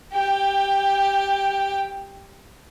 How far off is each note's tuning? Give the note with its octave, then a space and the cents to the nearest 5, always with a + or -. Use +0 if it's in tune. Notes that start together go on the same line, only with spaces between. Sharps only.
G4 +0 G5 +15